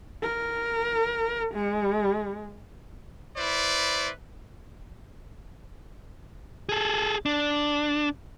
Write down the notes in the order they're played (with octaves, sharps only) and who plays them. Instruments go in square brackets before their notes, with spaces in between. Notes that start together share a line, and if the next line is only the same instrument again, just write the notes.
[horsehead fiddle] A#4
G#3
[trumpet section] E4 B4 C5 D5
[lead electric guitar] G#4 A4
D4